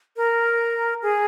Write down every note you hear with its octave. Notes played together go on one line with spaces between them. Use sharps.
A#4
G#4